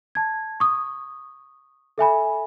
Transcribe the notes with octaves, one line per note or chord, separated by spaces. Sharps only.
A5 G#6
C#6 D#6
A4 E5 G#5 B5